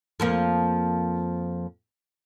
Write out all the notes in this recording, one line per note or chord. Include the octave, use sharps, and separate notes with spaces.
F2 F3 A#3